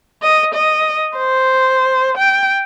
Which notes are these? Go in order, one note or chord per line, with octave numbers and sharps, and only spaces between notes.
D#5
D#5
C5
G5